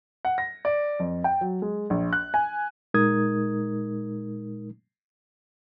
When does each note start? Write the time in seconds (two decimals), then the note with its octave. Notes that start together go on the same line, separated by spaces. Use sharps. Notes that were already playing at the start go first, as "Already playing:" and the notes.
0.25 F#5
0.38 A#6
0.65 D5
0.99 F2
1.24 G5
1.41 F#3
1.62 G#3
1.90 A#1
2.13 F#6
2.34 G#5
2.94 A#2 G#3 D#4 A#4 D#6 G#6